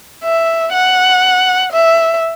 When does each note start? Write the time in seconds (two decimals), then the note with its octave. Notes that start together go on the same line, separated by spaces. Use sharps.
0.24 E5
0.74 F#5
1.72 E5